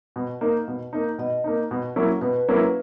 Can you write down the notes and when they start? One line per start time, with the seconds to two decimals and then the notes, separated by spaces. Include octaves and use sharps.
0.16 B2
0.41 A#3 D#4
0.68 B2
0.93 A#3 D#4
1.18 B2 D#5
1.44 A#3 D#4
1.71 B2
1.96 F#3 A#3 C#4 E4
2.21 B2 B4
2.48 F#3 A#3 C#4 E4